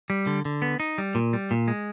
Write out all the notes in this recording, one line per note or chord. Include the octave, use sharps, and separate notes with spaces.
G3
D3
D3
B3
D#4
G3
A#2
G3
A#2
G#3